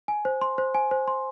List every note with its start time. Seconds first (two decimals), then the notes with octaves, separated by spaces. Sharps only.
0.08 G#5
0.25 C5
0.41 C6
0.58 C5
0.74 G#5
0.91 C5
1.08 C6